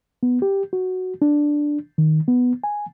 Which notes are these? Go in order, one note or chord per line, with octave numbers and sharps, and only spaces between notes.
B3
G4
F#4
D4
D#3
B3
G#5